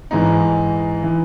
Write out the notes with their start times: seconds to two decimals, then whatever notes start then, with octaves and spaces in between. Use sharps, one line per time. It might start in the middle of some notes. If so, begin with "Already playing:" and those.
0.11 G#2 E3 D#4
1.03 E3